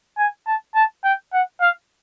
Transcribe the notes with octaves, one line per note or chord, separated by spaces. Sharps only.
G#5
A5
A5
G5
F#5
F5